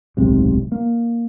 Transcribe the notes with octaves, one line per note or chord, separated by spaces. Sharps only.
D1 B1 G#2 C3
A#3